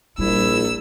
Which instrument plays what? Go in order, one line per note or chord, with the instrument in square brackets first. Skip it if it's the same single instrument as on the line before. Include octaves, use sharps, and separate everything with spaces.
[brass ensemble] A#1 [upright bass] G3 [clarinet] E4 [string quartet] E6